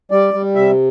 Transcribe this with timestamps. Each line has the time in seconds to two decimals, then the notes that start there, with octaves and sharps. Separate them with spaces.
0.11 G3 D5
0.34 G3
0.55 C3 E5